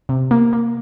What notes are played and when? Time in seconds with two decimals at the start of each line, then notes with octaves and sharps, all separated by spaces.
0.09 C3
0.31 A#3
0.53 A#3